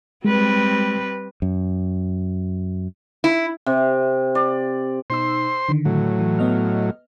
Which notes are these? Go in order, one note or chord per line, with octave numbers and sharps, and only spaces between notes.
G3 G#3 C4 B4
F#2
E4
C3
D5
B2 D#4 C5 C6 E6
D3 D#3
A2 F#3
E3
B3 D#5 F6